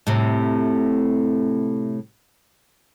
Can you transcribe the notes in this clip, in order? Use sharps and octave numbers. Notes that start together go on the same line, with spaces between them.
A2 C3